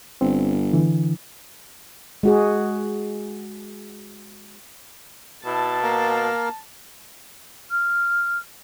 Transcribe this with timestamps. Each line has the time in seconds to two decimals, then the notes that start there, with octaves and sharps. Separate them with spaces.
0.21 G1 C4
0.73 D3 E3
2.23 G#3 F#4 G#4
5.46 B2 E4 A5
5.82 A#3 A#4 F5
7.71 F6